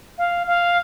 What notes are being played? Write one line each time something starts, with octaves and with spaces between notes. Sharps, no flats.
F5
F5